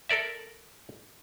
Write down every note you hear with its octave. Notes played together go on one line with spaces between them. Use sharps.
A4 A#4 D5 E5